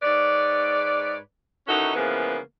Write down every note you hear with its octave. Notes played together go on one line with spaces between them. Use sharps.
G#2 B4 C#5 D5
D#3 E3 C#4 D#4 F#4 A4
C#3 E3 F3 G#3 A#3 B3